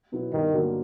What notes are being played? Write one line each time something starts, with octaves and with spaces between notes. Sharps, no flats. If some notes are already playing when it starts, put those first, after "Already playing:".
B2 F#3 B3 E4
G2 D#3
D3 F#3 A#3